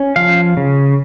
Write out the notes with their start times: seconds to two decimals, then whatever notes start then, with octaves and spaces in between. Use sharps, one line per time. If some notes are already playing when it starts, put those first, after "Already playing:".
Already playing: C#4
0.16 F3 F5
0.57 C#3